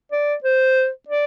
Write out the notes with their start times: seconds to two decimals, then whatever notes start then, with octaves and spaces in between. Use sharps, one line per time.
0.12 D5
0.44 C5
1.09 D5